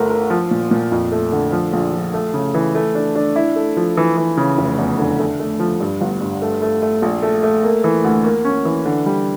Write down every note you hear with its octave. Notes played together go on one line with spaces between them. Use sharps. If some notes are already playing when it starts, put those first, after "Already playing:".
Already playing: G1 A3 A#4
A#4
F3
A#2
A#2
F2
A3
D3
F3
A#1
F3
A3
C#3
E3
A3
D4
D4
E4
A3
F3
E3
E3
C#3
F1
E2
D3
A3
A3
F3
G2
G1
G2
A3
A3
A3
A#1
A3
A3
A#3
E3
D2
A#3
C#4
E3
D3
G3